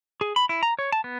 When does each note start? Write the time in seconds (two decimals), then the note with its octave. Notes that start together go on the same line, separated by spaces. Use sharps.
0.21 G#4
0.36 B5
0.49 E4
0.63 A#5
0.79 C#5
0.92 A5
1.04 B3